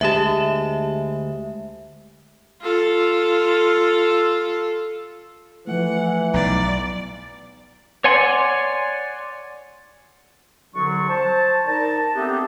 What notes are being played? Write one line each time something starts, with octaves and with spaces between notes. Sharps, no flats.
D2 G#3 G4 E5 A5
F4 A4
E3 F3 A3 F#5
B1 D5 A#5
C#5 D5 F#5 G#5 C6
C2 D3 F#3 D4 C#6
C5 A5
D4 D#4 A#4 A5
A3 B3 C4 D4 D#4 G4